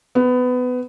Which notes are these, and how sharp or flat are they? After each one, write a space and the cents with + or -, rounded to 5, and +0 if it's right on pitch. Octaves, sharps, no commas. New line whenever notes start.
B3 +20